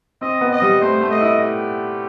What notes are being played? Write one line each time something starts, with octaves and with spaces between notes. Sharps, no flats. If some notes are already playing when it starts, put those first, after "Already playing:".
C4 D#5
B3
D#5
G3
A3 C5
A3
D#5
E4
G4